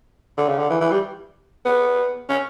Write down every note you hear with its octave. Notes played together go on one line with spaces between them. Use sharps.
D3
C#3
D3
E3
E3
G3
B3
C#4